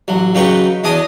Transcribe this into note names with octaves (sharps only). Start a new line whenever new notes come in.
A1 F#3
C#3 F#3 D#4 B4 G5 C#6
E2 D4 D#5 G#5 D6 D#6